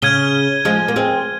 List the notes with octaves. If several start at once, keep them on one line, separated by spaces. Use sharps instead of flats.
C#3 F6 G#6 D#7 G7
F3 G#3
A#3
G#3 C4